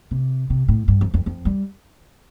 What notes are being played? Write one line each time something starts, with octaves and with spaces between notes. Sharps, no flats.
C3
C3
A2
G2
F2
F2
F2
G3